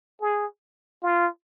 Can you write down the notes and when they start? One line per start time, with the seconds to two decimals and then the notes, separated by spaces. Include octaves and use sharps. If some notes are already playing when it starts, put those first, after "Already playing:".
0.22 G#4
1.03 F4